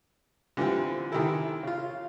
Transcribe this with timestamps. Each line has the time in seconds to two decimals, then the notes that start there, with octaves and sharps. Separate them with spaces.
0.57 D3 E3 F3 G3 C4
1.12 C3 D#3 E3 G3 E4 A4
1.63 C#3 F4